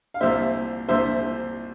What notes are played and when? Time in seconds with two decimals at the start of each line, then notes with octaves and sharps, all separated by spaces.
0.14 F5
0.21 C2 A#2 C5 E5
0.88 C2 A#2 C5 E5